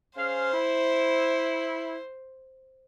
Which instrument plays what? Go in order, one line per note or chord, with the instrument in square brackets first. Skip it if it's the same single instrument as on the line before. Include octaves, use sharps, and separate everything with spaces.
[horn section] C#4 G#4 F5 [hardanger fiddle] C5
[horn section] E4